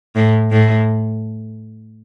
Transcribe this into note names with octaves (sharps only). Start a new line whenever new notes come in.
A2
A2